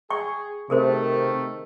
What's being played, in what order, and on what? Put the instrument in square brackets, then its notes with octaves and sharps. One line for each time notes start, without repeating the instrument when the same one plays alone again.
[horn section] G#4 [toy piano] G5 C#6
[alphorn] C3 [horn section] D#3 A3 [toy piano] G#4 A#4 C5